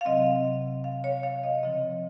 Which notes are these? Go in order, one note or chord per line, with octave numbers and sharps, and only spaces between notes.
F5
C3 F#3 C4 D#5
F5
C#5
F5
D#5
C#3 F3 C4 D#5